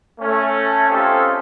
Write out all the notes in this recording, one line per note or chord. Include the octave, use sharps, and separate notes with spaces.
A3 C#4
C4 C#4 D#4 F4 G4 A4